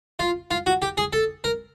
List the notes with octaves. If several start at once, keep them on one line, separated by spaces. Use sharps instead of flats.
F4
F4
F#4
G4
G#4
A4
A#4